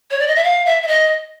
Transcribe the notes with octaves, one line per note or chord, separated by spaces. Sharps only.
C#5
D5
D#5
E5
F5
E5
E5
D#5